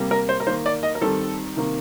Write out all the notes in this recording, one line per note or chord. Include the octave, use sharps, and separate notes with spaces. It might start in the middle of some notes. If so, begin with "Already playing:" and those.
Already playing: C3 G3 A#3
A#4
C5
A#4
D#3 A#3 C5
D5
D#5
A#4
D#3 G3 C4 A4
C3 D#3 A#3